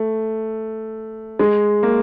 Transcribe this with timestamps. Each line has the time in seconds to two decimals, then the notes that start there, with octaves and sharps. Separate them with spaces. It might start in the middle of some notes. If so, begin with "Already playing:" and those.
Already playing: A3
1.39 G#3
1.83 A#3